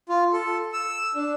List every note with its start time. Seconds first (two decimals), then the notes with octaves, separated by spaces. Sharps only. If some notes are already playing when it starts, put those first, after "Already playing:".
0.09 F4
0.33 A4
0.73 E6
1.15 D4